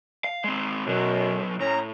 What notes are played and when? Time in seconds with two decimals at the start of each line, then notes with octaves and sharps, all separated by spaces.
0.24 F5
0.44 G#3 C4
0.87 B1 F#2 B2 F#3
1.60 A2 C#4 A#5